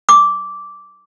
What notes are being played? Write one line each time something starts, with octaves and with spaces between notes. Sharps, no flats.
D6